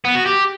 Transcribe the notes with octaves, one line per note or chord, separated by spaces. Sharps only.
B3
F#4
G4